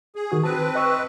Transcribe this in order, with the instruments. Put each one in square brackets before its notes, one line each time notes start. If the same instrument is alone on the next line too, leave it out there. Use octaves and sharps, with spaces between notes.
[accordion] G#4
[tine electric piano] D#3 F#4 D#6
[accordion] C4 B4 [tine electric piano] A5
[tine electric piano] D#5 C#6 E6